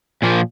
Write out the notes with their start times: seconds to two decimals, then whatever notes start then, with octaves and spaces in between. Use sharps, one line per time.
0.22 A#2 F3 A#3